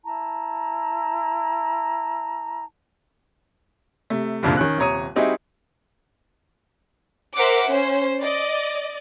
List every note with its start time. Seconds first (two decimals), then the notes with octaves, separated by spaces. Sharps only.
0.04 E4 A5 A#5
4.10 C3 A3
4.43 F#1 C2 F2 A#2 D3 F3
4.57 D#3 C#4 F#6
4.78 D#1 C3 C#5 A#5 D#6 D#7
5.16 G3 C4 D#4 E4 F#4 G#4
7.35 A#4 C5 E5 F#5 D6
7.68 C#4 C5
8.21 D5 D#5